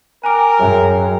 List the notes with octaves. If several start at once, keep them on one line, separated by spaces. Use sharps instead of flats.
A#4 G5 G#5 A#5 D6 F#6 D7
F#2 G#4 C#5 E5 G5